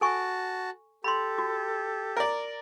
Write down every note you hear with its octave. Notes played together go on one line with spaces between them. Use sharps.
F#4 A4 G#5 A5 C#6
G4 A4 B5 C6
F#4
A#4 D5